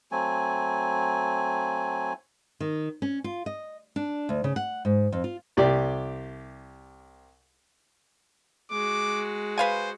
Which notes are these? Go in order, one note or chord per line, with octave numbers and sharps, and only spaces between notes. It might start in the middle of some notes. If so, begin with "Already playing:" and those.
F#3 A3 C4 G#5
D#3
C#4
F4
D#5
D4
D2
C#3
F#5
G#2
F2
F4
C2 G4 D5
G#3 F#4 D6
B4 C5 F5 G#5